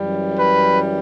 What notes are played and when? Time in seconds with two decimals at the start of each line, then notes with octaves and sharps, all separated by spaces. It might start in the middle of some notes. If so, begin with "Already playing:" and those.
Already playing: F#2 E3 G3
0.38 B4